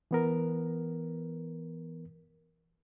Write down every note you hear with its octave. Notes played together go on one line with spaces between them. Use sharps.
E3 B3 A#4